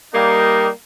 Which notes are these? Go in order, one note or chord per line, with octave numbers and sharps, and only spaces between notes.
G3 A#3 D#4